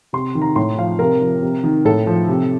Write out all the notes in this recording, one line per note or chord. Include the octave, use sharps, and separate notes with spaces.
C3 C6
D#3
A#5
A2 C6
F3 F5
C3 A#4
F3
C3
D#3
A2 A4
F3
C3